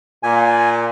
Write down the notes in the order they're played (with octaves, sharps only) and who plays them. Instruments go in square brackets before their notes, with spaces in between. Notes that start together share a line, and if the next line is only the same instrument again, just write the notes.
[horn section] A#2 [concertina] G#5